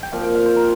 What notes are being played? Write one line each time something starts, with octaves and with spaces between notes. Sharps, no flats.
G5
A#2 F3 C4 F5
G5
F5
C5
A#4